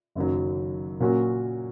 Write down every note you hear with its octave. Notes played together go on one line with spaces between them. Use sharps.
F#1 F#2 D#3 F#3
A#2 F#3 A#3 C#4 F#4